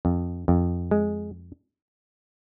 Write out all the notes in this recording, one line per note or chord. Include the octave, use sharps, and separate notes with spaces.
F2
F2
G#3